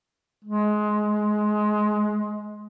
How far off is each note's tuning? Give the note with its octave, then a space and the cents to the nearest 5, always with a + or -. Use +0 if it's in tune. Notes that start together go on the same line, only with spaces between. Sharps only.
G#3 +20